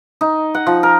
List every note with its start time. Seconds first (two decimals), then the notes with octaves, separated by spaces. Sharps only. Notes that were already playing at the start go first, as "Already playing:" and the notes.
0.21 D#4
0.55 F#5
0.67 F3
0.83 A#4